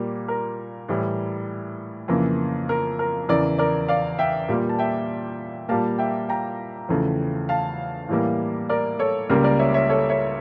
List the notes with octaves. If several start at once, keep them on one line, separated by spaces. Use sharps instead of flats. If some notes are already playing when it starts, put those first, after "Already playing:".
Already playing: A#2 G3 A#3
A#4
A2 E3 G3
F2 C#3 E3 A#3
A#4
A#4
E2 C#3 E3 A#4 D5
A#4 D5
D5 F5
E5 G5
A#2 G3 A#3
A5
E5 G5
A#2 G3 A#3 F5 A5
E5 G5
G5 A#5
E2 C#3 F3 A3
F5 A5
A2 E3 G3 A#3
A#4 D5
A4 C#5
C#2 C#3 G3 A#3 A#4
A#4 D5
C#5 E5
C#5 E5
A4 C#5
C#5 E5